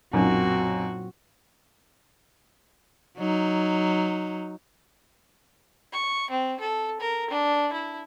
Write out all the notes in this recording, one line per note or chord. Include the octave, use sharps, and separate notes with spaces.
B1 F#2 A#2 F#3 C4 F4 F#4
F#3 D#4
C#6
C4
A4
A#4
D4
E4